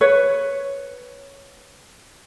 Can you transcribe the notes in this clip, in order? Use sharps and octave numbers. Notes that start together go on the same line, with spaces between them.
B4 C#5